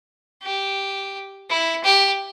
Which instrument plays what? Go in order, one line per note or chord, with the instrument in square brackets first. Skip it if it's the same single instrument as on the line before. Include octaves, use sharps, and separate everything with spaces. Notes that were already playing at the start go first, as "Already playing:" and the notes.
[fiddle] G4
E4
G4